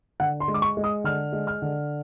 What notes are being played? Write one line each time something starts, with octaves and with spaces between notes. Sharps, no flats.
D3 F#5
C6
G#3
D6
C#6
G#3
D#6
D3 F6
G#3
F6
D3